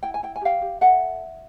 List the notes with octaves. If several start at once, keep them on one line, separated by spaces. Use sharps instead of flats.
E4 G5
G#5
E4 G5
G#5
G4 F5 G5
G4
A4 E5 F#5